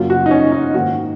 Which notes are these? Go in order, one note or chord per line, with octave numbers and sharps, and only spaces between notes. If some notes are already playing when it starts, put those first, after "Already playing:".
Already playing: F#2 C#3 F#3 A#3 F4
F#4
D#4
C#4
D#4
G#2 D#3 A#3 F#4